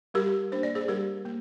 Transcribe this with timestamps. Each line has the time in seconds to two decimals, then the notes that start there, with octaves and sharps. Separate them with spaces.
0.14 G3 G4 A#4
0.52 A#3 D4 C5
0.63 D5
0.75 G#4 C5
0.88 G3 G4 A#4
1.25 A#3